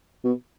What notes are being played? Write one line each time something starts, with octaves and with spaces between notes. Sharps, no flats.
B2